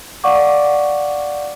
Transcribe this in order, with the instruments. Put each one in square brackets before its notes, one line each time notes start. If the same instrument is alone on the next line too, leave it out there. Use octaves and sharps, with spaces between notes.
[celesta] D5 F5 F#5 C#6 D6